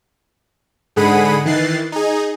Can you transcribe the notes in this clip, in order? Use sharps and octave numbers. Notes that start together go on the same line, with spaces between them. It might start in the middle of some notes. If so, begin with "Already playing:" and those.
G#2 D3 G#4 F#5 B5 D#7
D#3 E3 F#6 A6 C7
D#4 G#4